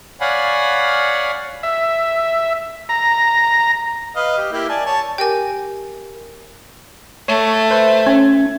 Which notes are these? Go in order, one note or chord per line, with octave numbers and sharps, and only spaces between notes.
C#5 D5 F5 F#5 G#5 B5
E5
A#5
B4 D#5 F5
G4
A#3 E4 G4
D5 G#5 A5
C#5 A5
G4 A#4 G5 G#5 D6
A3 C#5
B4 C5 E5
C#4 G#6